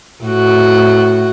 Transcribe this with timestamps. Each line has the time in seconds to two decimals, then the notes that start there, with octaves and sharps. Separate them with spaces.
0.24 A2 F#4